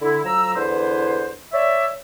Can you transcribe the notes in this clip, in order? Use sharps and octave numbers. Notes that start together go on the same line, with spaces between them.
D3 E4
D2 F3 F#3 A#5 E6
E2 D3 E4 B4 C5
C#5 D5 E5